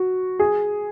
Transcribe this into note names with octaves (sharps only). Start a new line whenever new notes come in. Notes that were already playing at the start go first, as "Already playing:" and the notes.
Already playing: F#4
G#4